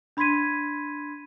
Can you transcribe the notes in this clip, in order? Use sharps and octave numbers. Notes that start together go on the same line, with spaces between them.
D4 B5 C6 G#6 B6 D#7